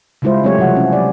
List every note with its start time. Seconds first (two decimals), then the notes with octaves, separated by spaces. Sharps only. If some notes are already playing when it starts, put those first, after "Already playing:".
0.22 C#3 G3 G#3 E4 F4 C5
0.44 F#3 A3 C4 E4 G4 C#5
0.58 C3 E3 F3 F#5
0.77 C#4 E4
0.92 F#3 D5